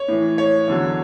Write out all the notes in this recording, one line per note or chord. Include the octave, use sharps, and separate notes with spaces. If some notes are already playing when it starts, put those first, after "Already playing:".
Already playing: C#5
A2 E3
C#5
E2 D3 F#3